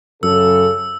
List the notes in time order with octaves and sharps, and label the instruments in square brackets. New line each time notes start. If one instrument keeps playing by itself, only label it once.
[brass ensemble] F#2 C#3 A4 [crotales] E6